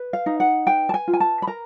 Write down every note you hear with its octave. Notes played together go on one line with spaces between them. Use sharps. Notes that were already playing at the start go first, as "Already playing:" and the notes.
Already playing: B4
F5
D#4
F#5
B4 G5
A5
G#5
F4
G#5
A5
B5
A#4 A#5